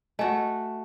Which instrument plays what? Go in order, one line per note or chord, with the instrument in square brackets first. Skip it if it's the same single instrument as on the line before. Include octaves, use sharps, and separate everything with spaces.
[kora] A3 F#4 [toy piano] D#5 G#5